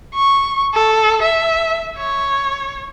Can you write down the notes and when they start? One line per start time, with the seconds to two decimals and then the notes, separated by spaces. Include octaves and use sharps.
0.15 C#6
0.74 A4
1.22 E5
1.97 C#5